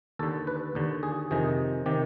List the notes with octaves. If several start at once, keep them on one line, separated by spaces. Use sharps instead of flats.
D#2 D3 A4
B4
D#2 D3
G#4
F2 C3 D#3 G#4
C3 D#3 G4